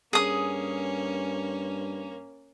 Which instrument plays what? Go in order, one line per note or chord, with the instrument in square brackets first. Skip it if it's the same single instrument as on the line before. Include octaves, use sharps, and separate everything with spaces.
[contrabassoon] G2 [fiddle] A#3 C#4 [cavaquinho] G#4 D#6